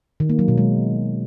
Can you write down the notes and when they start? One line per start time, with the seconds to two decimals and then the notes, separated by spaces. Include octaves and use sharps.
0.20 D#3
0.29 A#3
0.39 F#3
0.48 B2
0.58 G#3